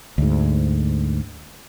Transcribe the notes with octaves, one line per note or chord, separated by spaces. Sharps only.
D2 G#2